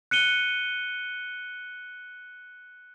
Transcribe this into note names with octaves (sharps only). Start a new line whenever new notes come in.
F#6 C#7 D#7 G7